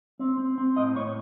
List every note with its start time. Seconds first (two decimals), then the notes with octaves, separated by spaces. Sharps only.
0.19 C4
0.38 C4
0.58 C4
0.76 A2 D#5
0.95 A2 C#5